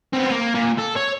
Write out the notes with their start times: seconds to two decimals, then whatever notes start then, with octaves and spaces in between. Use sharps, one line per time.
0.13 B3 C4
0.31 A#3
0.55 A#2
0.79 A4
0.97 C#5